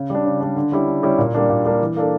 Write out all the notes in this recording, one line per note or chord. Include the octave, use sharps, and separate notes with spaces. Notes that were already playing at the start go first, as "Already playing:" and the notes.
Already playing: C#3
G3 D4
C#3
G3 D4
D3
G3 C#4 E4 G4
D3
G3 C#4 E4 G4
A#2
G3 A#3 D4
A#2
G3 A#3 D4
E3
A#3 D4 A4